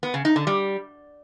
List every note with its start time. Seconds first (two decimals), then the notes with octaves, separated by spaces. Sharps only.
0.03 B3
0.14 C#3
0.25 D#4
0.36 D3
0.47 G3